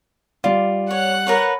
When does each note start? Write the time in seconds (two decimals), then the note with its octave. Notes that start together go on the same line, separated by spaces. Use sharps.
0.44 G3 F4 D5
0.91 C#5 F#5 F#6
1.27 A#4 B4 C#5